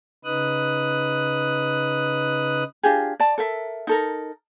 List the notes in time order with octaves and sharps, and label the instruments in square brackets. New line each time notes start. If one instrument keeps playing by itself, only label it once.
[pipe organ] C#3 D#4 B4 D#6 F#6
[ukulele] D4 F4 G4 G#4
D5 A5
A4 A#4 E5
D#4 A4 A#4